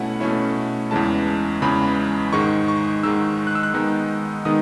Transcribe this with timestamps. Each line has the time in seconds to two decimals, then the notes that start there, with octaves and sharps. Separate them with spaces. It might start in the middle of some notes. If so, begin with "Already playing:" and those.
Already playing: B2 A3 C#4 E4 F#5
0.20 B2 A3 C#4 E4
0.91 E2 C#3 E3 G#3 A5
1.62 E2 C#3 E3 G#3 B5
2.33 G#2 D#3 G#3 D#4 C#6
2.68 C#6
3.03 G#2 D#3 G#3 D#4 E6
3.47 F#6
3.55 E6
3.63 F#6
3.74 D#3 G#3 B3 D#4
4.45 D#3 G#3 B3 D#4 D#6